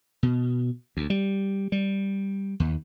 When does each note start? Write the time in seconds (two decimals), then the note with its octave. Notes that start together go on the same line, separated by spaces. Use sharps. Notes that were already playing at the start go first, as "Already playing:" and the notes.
0.23 B2
0.97 D2
1.10 G3
1.72 G3
2.60 D#2